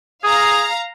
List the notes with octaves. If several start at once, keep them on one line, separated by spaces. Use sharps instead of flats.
G#4 F5 A#5